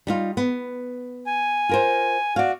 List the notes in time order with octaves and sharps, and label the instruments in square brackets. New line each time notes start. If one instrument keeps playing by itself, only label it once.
[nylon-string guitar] G3 D#4 F4
B3
[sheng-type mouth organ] G#5
[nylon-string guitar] F4 A#4 C5
[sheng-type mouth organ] F#4 [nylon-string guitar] D5 F5